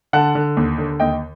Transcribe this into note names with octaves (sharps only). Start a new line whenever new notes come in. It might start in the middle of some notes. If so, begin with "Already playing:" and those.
D3 F#5 A5
D3
D#2
D3
D#2 D#5 G5